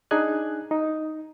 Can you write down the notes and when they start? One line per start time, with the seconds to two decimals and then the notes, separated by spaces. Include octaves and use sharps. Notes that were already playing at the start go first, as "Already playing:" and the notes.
0.11 D4 D#4 G#4 G#5 F#6
0.71 D#4